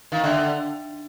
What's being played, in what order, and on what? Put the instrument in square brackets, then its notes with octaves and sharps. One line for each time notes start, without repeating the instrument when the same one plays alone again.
[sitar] D#3 [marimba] F5
[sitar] D3 [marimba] E5